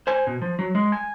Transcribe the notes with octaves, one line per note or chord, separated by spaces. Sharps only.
C5 G#5
B2
F3
F#3
G#3
G#5